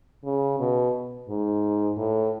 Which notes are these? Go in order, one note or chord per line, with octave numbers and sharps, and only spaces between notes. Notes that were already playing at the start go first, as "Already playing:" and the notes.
C#3
B2
G#2
A2